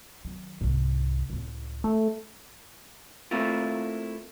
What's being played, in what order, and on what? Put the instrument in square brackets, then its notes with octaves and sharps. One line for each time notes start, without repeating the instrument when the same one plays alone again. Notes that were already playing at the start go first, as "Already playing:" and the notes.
[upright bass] D#3 F#3
C2 G#2
C#2 A2
[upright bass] G#3 [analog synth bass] A3
[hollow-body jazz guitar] A3 A#3 C4 E4 F4